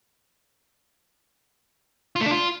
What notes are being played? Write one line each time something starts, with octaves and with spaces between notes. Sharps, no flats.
F4
A3
D4
F4